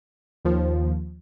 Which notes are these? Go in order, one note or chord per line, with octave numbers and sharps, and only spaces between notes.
D#2 F3